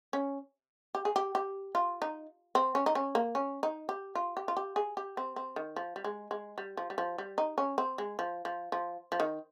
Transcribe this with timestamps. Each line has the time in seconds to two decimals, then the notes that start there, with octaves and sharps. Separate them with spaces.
0.13 C#4
0.95 G4
1.05 G#4
1.16 G4
1.35 G4
1.75 F4
2.02 D#4
2.55 C4
2.75 C#4
2.86 D#4
2.95 C#4
3.15 A#3
3.35 C#4
3.63 D#4
3.89 G4
4.15 F4
4.37 G4
4.48 F4
4.57 G4
4.76 G#4
4.97 G4
5.17 C4
5.36 C4
5.56 D#3
5.76 F3
5.96 G3
6.04 G#3
6.31 G#3
6.58 G3
6.77 F3
6.90 G3
6.98 F3
7.18 G3
7.38 D#4
7.58 C#4
7.78 C4
7.98 G#3
8.19 F3
8.45 F3
8.72 F3
9.12 F3
9.20 D#3